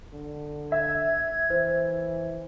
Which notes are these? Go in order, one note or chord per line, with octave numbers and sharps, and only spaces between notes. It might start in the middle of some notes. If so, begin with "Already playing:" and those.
D3
E5 G#6
E3 C5